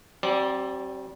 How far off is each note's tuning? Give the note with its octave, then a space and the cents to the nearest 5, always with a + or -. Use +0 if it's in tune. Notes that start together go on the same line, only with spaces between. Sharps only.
G3 -40 C4 +35 D5 +0